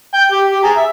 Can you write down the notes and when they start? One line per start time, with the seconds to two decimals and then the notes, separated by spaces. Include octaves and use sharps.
0.14 G5
0.32 G4
0.51 G4
0.64 G#4 A#5
0.77 E5